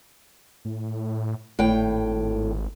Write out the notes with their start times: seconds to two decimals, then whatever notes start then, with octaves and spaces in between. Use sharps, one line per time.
0.65 A2
1.59 G#1 A2 G5